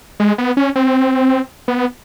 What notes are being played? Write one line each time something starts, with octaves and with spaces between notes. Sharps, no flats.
G#3
B3
C#4
C4
B3